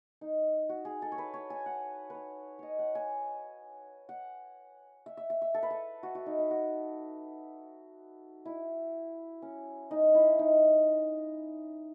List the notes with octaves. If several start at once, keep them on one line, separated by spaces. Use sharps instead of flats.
D#4
F#4
G#4
A4
C#5
B4
C#5
G#5
F#5
B4 C#5
C#5 D#5
F#5
G#5
F#5
E5
E5
E5
E5
A4
B4
A4
F#4
F#4
D#4
D#4
F#4
E4
C#4
D#4
E4
D#4